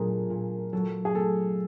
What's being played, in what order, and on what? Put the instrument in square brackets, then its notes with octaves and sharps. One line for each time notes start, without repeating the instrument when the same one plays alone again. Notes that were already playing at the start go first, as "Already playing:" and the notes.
Already playing: [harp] A#2 F#3 A3 [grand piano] D4 G#4 A#4
[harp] A#2
[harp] F#3 [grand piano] A4
[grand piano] G#4
[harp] A3 [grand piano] A4